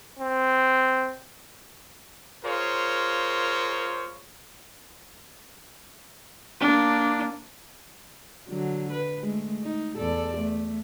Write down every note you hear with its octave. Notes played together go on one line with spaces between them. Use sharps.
C4
F4 G#4 A#4 C5 C#5
A#3 D4
D3 F#3
B4
G#3 A3
D#4
E2 A4 D5
A3